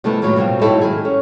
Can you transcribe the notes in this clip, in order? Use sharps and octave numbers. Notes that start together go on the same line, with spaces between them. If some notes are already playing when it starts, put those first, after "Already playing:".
C3 F3 G#3 A3 B3 E4
A2 D#3 F3 F#3 G#3 A#3
F#2 B2 G3 C4 F4
G#2 F#3 D#4 E4 G4 A4
D#3 G#4
C#4